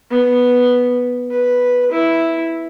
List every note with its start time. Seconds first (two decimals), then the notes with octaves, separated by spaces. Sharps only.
0.11 B3
1.30 B4
1.91 E4